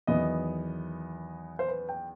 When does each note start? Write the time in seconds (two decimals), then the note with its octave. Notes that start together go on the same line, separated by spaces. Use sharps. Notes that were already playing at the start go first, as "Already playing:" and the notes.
0.07 E2 D#3 F#3 B3 D#5
1.59 C5
1.68 B4
1.89 G5